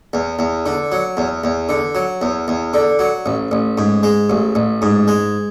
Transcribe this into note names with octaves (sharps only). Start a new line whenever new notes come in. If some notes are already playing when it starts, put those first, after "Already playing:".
E2
E2
D3
F#3
E2
E2
D3
F#3
E2
E2
D3
F#3
A1
A1
G#2
G#3
A1
A1
G#2
G#3